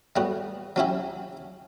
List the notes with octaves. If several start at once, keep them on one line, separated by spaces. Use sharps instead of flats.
A2 G3 B3 F#4
F#3 C#4 E4 G4